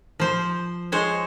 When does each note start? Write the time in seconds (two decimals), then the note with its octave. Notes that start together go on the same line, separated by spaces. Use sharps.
0.20 F3 C5
0.92 G#3 C5 C#5